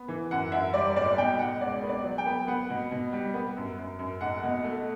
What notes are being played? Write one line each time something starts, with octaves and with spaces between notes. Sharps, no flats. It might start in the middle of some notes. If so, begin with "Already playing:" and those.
Already playing: B3
E3
F#2 F#5
F#2 E5
G3 D5
B1 D5
B2 G5
B2 F#5
C#2 D5
B3
D5
F#3
G5
B3
B3 F#5
B2
B2
G3
B3
F#2
F#2
F#2
B1 F#5
B2
A3